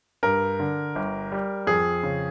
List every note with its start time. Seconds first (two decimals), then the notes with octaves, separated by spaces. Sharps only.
0.23 G2 A#4
0.60 D3
0.95 G1
1.32 G3
1.67 F2 G#4
2.03 C#3